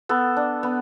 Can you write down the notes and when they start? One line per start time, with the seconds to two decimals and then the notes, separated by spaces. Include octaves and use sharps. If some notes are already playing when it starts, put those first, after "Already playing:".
0.09 B3 A4
0.37 D4
0.63 B3